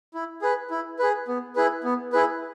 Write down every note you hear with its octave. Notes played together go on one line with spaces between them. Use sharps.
E4
G#4 B4
E4
G#4 B4
B3
E4 G#4 B4
B3
E4 G#4 B4